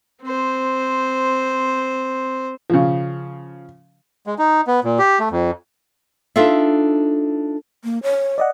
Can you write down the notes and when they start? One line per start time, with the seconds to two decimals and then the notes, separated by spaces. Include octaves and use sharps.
0.22 C4 C5
2.70 C#3 F3
4.27 G#3
4.39 D#4
4.67 B3
4.84 A#2
4.99 G4
5.19 A3
5.31 F2
6.36 D4 D#4 F4 A4 E5
7.84 A#3
8.03 C#5
8.38 D5 D#5 F#5